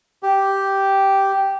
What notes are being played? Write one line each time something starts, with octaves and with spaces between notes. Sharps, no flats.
G4